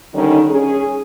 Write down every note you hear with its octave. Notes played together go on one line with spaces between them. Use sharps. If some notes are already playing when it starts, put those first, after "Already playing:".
D3 D#3 G3 C#4 D#4
C#4 G#4